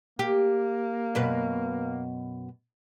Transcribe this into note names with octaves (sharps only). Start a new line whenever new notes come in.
A#3 G4
F#2 B2 B4